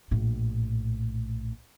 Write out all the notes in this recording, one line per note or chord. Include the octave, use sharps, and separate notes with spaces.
A#1 A2